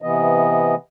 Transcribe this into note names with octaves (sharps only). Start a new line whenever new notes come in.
C3 E3 B3 D#5